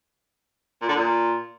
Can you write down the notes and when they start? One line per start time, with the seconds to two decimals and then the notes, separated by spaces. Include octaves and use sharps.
0.81 A#2
0.89 D3
0.96 A#2